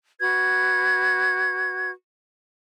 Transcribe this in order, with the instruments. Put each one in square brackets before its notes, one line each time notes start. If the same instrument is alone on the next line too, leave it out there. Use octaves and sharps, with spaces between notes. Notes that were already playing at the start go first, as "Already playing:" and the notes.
[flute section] F#4 B4 G#6